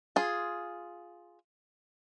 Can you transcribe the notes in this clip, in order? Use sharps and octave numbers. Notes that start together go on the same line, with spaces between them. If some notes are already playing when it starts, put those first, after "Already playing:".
F4 G#4